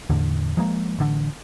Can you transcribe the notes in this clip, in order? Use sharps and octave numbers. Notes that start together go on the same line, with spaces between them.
E2 A2 D3
F3 G#3 A#3
A1 D3